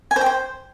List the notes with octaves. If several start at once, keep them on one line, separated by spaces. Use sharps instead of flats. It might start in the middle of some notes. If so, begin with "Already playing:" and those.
G#5
C5
G5
C5